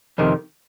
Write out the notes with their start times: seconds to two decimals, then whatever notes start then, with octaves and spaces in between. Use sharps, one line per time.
0.18 F2 C3 D#3